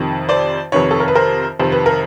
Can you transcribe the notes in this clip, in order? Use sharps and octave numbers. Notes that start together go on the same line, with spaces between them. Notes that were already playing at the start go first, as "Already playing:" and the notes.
Already playing: F2 C3 D#3
C5 D5
F2 C3 D#3 B4 C#5
A4
A#4
B4
A#4 C5
F2 C3 D#3 C5
B4
A#4